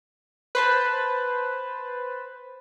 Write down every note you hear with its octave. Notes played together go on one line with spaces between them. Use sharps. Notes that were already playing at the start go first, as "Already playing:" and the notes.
B4 C5 A5